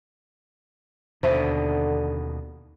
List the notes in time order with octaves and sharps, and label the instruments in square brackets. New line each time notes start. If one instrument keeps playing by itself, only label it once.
[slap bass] D#2 B2 [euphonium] D3 [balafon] C5 E5